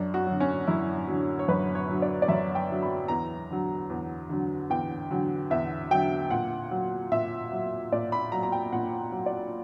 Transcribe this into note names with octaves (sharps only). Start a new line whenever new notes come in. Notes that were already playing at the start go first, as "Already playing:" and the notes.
Already playing: F#2 D4
F#4
D3 F#3
C#4
F#2 E4
D3 F#3
C#5
F#2 B4
C#5
D3 F#3
D5
D5
F#2 E5
G5
D3 F#3
B5
E2 A#5
D3 F#3
E2
D3 F#3
E2 G5
D3 F#3
E2 E5
D3 F#3 G5
A#2 F#5
F#3
A#2 E5
F#3
A#2 D5
B5
F#3 A#5
A#5
G5
A#2 F#5
F#3
D5